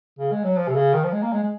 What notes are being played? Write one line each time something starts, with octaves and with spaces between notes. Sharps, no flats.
C#3
G#3
F#3
F3
C3
C#3
D#3
F3
G#3
A#3
G#3
G#3